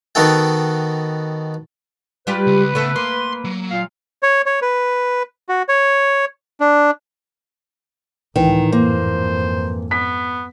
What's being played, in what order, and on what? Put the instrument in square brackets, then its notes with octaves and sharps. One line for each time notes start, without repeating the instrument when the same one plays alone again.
[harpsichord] D#3 B3 D#4 F#4 A4 G5
[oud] G3 F4 G4 [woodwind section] B4
[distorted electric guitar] C#2
[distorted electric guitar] C#3 [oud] A3 B3 A4
[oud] A#3 [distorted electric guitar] C6
[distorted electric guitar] F#3
[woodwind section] A#2 F4 F5
[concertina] C#5
C#5
B4
F#4
C#5
D4
[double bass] C#2 A2 [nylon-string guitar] D#3 [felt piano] E3
[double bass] F2 G#2 [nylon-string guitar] A#3 [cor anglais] C5
[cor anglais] B3 [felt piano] B6